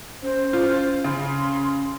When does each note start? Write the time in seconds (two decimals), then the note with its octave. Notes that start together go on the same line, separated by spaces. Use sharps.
0.22 C#4 C5
0.53 F4
1.04 C#3 C6